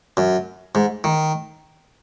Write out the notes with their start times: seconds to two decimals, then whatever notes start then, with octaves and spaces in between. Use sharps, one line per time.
0.17 F#2
0.75 G#2
1.04 D#3